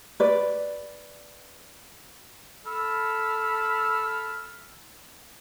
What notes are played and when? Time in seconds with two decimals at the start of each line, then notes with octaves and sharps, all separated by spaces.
0.20 B4 D5
2.66 A4 B5 E6 F6